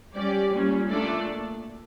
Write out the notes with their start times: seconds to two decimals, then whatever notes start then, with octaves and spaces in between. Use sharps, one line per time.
0.13 G3 C#4 G4 D5
0.51 A#2 G3 C#4
0.89 A#2 A3 D4 A4 D5